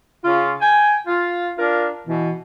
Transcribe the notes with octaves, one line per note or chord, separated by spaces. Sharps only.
C#3 F4
G5 G#5
F4
D4 F4 A#4
B2 E3